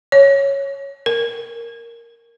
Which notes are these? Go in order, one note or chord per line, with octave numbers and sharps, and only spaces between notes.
C#5
A#4